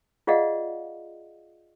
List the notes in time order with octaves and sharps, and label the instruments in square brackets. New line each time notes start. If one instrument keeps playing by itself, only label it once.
[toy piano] F4 G#4 D5 D#5 F5 F#5